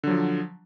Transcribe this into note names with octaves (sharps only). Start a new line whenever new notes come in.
D3 F3 F#3